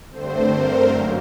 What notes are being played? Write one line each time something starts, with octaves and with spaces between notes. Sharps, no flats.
G2 D3 A3 C4 C5
A#4
F#2 F#3 A#3